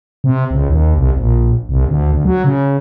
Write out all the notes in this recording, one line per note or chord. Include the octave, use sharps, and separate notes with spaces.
C3
C#2
D#2
C2
A#1
C2
D2
D2
F#3
C#3